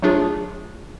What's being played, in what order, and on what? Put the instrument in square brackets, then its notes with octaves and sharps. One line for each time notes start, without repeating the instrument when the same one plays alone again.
[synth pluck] F#3 A3 D4 F4 G#4